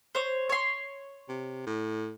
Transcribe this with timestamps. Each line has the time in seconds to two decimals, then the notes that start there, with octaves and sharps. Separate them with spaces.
0.15 C5 C#5
0.49 C#5 C6
1.29 C3
1.66 A2